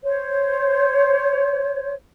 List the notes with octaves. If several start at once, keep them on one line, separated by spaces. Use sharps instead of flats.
C5 C#5